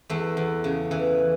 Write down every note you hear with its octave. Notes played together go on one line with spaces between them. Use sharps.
E2 A3
E2
C#3
E3